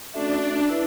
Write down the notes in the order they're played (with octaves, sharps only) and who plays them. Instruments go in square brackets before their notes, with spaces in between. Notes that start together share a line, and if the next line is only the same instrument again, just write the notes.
[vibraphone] A3 C#4 F#4 A4 E5 [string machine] D4
[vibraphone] E4 B4 E5